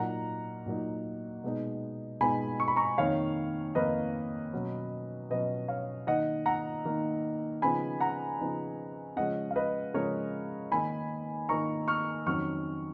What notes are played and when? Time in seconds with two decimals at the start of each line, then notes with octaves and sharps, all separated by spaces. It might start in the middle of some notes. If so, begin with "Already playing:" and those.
Already playing: A#2 F#3 A#3 D#4 F#5 A#5
0.66 A#2 F#3 A#3 D#4
1.44 B2 G#3 B3 D#4
2.21 B2 G#3 B3 D#4 G#5 B5
2.60 C#6
2.68 B5
2.76 A#5 C#6
2.98 F2 D#3 A#3 C#5 F5
3.75 F2 D#3 A#3 B4 D#5
4.53 B2 F#3 C#4
5.30 B2 F#3 C#4 B4 D#5
5.68 C#5 F5
6.07 D#3 A#3 D#4 D#5 F#5
6.46 F#5 A#5
6.85 D#3 A#3 D#4
7.62 C#3 F3 B3 D#4 G#5 B5
8.00 F#5 A#5
8.40 C#3 F3 B3 D#4
9.16 C#3 F3 G#3 C#4 D#5 F#5
9.51 F5
9.56 B4 D#5
9.94 C#3 F3 G#3 C#4 A#4 C#5
10.71 D#3 A#3 D#4 G#5 B5
11.49 D#3 A#3 D#4 A#5 C#6
11.88 C#6 F6
12.26 F2 D#3 F#3 C#4 C#6 F6